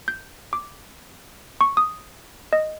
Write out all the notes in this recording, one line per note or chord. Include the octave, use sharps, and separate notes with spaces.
G6
D6
C#6
D#6
D#5